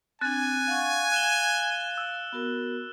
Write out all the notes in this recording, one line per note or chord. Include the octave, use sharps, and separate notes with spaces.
C4 D4 G#5 F#6 A6
F5 F#5 C#6
F5 F#6 E7 G7
E6
B3 F#4 A#4